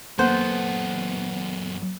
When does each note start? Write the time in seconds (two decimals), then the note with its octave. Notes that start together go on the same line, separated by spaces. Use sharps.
0.19 F#2 A#3 B3 A4 C5